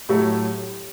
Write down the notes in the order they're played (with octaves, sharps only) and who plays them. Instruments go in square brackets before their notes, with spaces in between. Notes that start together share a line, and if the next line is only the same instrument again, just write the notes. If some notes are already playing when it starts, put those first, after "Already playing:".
[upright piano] A2 F#3 A3 [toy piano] G4